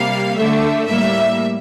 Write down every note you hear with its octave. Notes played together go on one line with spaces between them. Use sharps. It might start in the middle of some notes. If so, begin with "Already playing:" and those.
Already playing: C3 G3 A#3 F5
D3 A3 E5
A2 G3 A#3 E5